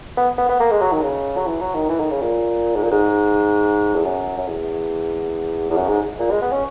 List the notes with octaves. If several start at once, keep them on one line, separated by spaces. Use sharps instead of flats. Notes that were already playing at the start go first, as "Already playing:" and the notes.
B3
B3
B3
A#3
G#3
F#3
D#3
C#3
F#3
E3
F#3
D#3
E3
D#3
C#3
A#2
G#2
A#2
G#2
E2
F#2
F#2
E2
E2
F#2
G#2
A#2
G#3
B3
C#4